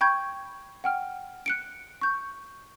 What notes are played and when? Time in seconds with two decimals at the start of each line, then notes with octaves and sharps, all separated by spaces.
0.01 G5 B5 C#6 G6 G#6
0.84 F#5 G5 F6
1.46 F#6 C#7 D7
2.01 C#6 G6